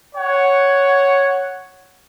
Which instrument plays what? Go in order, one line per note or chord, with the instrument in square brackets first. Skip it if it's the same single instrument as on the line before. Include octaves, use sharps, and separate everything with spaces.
[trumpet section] C#5 F#5